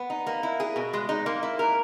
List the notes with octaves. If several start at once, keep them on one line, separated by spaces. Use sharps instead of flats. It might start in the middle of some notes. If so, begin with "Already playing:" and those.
Already playing: B3
D#4
A#3
E4
G#4
B2
G#3
D#4
A#3
E4
A#4